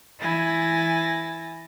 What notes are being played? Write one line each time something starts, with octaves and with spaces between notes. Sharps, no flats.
E3 E4 G#5 A6 A#6